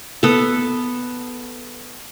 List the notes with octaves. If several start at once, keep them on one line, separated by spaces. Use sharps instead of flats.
B3 A4